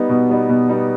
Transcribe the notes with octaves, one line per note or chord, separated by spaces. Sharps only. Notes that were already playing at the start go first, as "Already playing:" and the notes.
Already playing: G3 B3 D#4
B2
G3 B3 D#4
B2
G3 B3 D#4